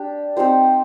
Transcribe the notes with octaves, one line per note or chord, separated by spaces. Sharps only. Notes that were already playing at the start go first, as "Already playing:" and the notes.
Already playing: D4 G4
C4 D#4 G4 C5